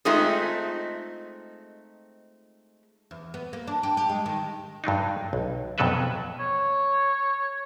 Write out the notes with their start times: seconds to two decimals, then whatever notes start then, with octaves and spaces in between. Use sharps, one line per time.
0.05 G#3 A3 C4 D#4 F4 G#4
3.11 E2
3.34 B3
3.53 A#3
3.67 D4
3.83 G4
3.97 G4
4.09 G#3
4.26 D#3
4.84 G2 F#3 D4 D#4
5.33 B1
5.78 F2 B2 F#3 A4 B4 E5
6.40 C#5